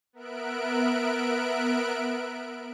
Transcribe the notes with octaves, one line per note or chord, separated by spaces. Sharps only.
B3 A#4 E5 F#6 D7